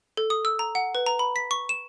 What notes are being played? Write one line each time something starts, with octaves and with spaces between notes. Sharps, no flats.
A4
D#6
E6
A#5
F#5
B4
A#5
B5
B6
C#6
E7